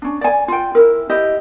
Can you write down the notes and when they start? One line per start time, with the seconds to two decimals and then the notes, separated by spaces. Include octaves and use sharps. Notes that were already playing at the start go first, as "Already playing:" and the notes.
0.02 C#4 D4
0.21 D5 G#5
0.48 F4 G5
0.75 E4 A#4
1.09 E4 G4 D#5